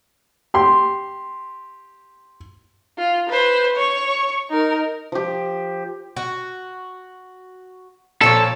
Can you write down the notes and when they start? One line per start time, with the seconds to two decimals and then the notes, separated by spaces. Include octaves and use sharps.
0.54 G4 C6
2.98 F4
3.29 B4 C5
3.76 C#5 C#6
4.49 D#4 A#4
5.12 F3 G4
6.17 F#4
8.21 A#2 F3 A4 C#5